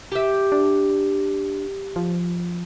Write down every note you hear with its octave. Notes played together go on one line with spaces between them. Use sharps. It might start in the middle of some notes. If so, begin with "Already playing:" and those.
G4 E5
D4
F3